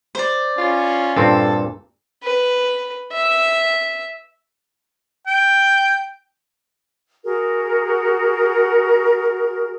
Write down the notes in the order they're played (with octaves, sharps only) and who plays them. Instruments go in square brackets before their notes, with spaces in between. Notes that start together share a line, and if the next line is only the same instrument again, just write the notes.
[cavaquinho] C5 D5
[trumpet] C#4 [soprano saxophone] F4
[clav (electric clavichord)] G2 A#2 C4 [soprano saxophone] A4
[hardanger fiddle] B4
E5
[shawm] G5
[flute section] F#4 G#4 A#4